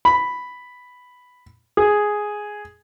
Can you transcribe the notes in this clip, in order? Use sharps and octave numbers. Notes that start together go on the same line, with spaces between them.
B5
G#4